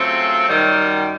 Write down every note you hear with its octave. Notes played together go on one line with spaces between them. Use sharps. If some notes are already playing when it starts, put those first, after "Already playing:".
Already playing: C#3 F#3 A3 C4 F4
F#2 D#3 G3